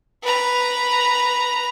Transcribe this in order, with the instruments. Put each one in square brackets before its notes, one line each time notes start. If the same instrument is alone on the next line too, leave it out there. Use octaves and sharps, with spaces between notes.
[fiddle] B4 A#5